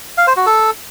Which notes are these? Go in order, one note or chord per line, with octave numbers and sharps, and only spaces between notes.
F5
C5
F#4
A4